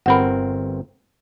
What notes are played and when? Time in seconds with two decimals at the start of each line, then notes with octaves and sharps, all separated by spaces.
0.06 G1 C4 A#4 F#5 B5